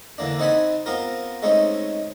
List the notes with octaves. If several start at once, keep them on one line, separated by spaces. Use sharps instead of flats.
D3 E3 A#3 D4
C4 D#4 F#5 G#5 A5 B5
B3 C4 F4 A#4
G#3 A3 C4 C#4 D#4